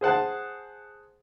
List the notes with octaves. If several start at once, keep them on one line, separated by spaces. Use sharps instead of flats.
G#4 C5 F#5 A5